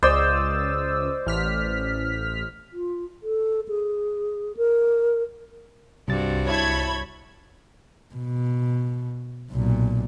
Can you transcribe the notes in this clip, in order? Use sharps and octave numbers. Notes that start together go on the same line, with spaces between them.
C#2 C5 D5 D#5 E6
A1 F6 B6
F4
A4
G#4
A#4
C2 G2 C4 F#4 A6
E4 C#5 A5 B5 G#6
B2
B1 A#2